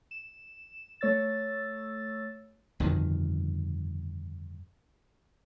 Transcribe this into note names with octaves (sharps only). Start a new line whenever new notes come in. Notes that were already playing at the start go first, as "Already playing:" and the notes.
E7
A3 C#5 E6 A6
G1 F2 B2 D#3